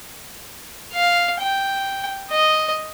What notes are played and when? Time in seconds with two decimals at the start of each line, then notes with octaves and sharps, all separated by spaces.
0.93 F5
1.40 G5
2.31 D#5